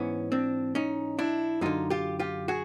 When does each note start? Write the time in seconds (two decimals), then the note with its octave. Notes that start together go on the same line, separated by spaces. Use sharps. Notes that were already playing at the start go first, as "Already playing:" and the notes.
Already playing: G#2 E3 B3 C#4
0.32 C4 D4
0.75 C#4 D#4
1.19 D4 E4
1.61 F#2 D3 D#4 F4
1.90 F4 G4
2.19 F4 G4
2.48 F#4 G#4